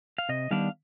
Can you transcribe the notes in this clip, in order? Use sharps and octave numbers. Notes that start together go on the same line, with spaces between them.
F5
C3 D#5
D#3 G3 B3 D4 F5